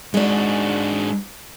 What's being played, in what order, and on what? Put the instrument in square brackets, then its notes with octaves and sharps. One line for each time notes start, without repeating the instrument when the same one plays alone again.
[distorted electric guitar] G#2 F#4 [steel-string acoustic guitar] G#3 D4